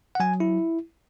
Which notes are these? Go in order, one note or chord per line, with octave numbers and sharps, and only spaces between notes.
F#5
F#3 G#5
E4